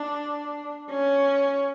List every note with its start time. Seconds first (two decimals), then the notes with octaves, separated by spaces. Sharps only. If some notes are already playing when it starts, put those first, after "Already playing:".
Already playing: D4
0.90 C#4